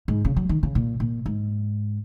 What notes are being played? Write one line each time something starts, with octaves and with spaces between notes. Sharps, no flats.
G#2
C#3
F#3
D#3
C#3
A#2
A#2
G#2